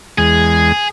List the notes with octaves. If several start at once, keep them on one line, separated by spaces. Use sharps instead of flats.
E2 G#3 G#4 G#5